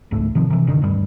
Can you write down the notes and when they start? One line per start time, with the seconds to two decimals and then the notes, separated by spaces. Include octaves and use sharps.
0.11 G#1 C#2 G#2 A3
0.35 C3 D#3 F3
0.50 C3 E3
0.67 F#1 D3 D#3
0.81 D1 G2 G3